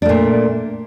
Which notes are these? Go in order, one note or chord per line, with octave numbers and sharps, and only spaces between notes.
A#2 A3 D4